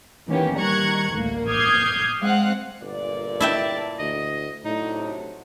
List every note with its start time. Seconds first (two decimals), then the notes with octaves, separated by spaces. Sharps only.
0.27 D#3 E3 A#3 B3 C#4 G4
0.56 D#3 G3 A#5 C#6 F#6 G#6
1.13 A1 D2 A#3
1.48 D6 D#6 F6 G6 G#6 C7
2.22 G#3 C4 F5 F#5 F#6
2.82 G1 A#2 D5
3.40 E4 E5 G5 A5
3.99 D2 D#5
4.65 A2 C3 F#3 D4 D#4